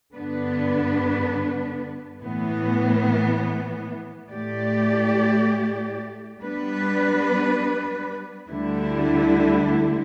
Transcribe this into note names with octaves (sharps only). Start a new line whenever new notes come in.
G2 D3 B3 D4 B4
A2 E3 B3
A2 A3 G4 D5
G3 B3 D4 B4
D2 D3 G3 E4